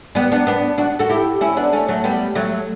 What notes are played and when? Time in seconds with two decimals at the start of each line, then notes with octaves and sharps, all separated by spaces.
0.15 G3 B3
0.32 B3 D4
0.47 B3 D4
0.78 D4 F#4
0.99 F#4 A4
1.10 E4 G4
1.41 C#4 E4
1.57 B3 D4
1.73 A3 C#4
1.88 F#3 A3
2.04 G3 B3
2.35 F#3 A3